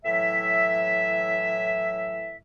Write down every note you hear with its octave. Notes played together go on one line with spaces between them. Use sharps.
A2 E3 F#3 E5